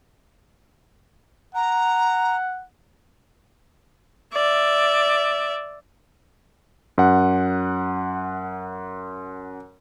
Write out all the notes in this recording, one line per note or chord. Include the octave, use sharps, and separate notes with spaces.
F#5 A#5
D5 E5
F#2 F#5